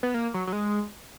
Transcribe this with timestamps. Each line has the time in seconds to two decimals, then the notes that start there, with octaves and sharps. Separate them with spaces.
0.03 B3
0.14 A#3
0.34 F#3
0.47 F#3
0.53 G#3